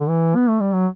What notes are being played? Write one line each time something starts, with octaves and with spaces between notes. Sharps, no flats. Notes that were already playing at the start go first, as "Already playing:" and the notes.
D3
E3
B3
A3
G3
F#3